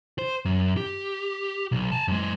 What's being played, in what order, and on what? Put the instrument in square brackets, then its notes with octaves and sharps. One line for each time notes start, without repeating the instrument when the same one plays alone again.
[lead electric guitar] C5
F#2
G4
B1
G#5 A5
F#2 G#3